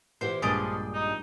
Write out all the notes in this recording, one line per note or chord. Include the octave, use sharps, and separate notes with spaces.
A#2 E3 G4 C5
A#1 G2 A#2 F3 G#3 G4 D5 D#5
D#4